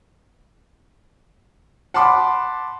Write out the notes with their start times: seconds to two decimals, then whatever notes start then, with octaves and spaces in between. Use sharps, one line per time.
1.94 F#5 A5 B5 C6 D6